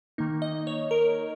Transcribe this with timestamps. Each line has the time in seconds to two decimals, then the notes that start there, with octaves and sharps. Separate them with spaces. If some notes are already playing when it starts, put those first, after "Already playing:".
0.18 D#3 A#3 D#4
0.42 D#5
0.67 C#5
0.91 A#4